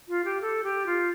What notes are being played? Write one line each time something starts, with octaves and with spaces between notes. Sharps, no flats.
F4
G4
A4
G4
F4